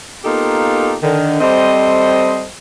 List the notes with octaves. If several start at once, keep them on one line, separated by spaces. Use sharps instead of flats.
A#3 B3 D#4 F4 G4 A4
D3 D#3
G3 C4 A4 C5 D#5